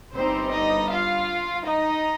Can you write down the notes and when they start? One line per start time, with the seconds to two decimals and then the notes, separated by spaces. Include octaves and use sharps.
0.13 G1 G2 G3 C4 D#4 C5
0.51 D#4 D#5
0.89 F4 F5
1.65 D#4 D#5